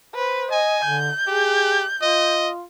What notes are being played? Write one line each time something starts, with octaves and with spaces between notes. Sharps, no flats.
B4 C5
D#5 G#5
D3 G6
G4 G#4
F4 D#5